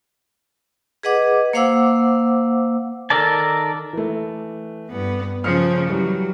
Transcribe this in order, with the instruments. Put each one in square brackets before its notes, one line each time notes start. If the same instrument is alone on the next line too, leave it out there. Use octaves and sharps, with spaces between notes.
[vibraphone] G#4 B4 D#5 F#5 D6
A#3 C5 F5 F#5 D6 E6
[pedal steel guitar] D#3 A4 A#4 D5 A5
[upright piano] E3 A3
[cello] G2 B3
[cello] C#3 F3 [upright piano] F6 C#7
[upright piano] E3 G3 [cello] F#3